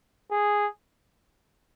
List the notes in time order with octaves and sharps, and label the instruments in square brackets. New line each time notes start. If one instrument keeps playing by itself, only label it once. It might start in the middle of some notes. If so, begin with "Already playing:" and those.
[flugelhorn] G#4